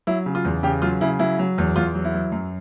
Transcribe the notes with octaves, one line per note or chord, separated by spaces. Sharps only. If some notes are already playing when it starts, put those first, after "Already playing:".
F#3 E4
C#3
F4
E2
C#3 G4
F#3 F4
C#3 E4
F#3 E4
F#3
E2
E2 F4
F#3
E4
F#3
F#2